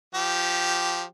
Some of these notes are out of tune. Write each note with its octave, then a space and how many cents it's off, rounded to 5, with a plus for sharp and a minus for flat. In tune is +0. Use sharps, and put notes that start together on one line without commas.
F3 +0 G4 -10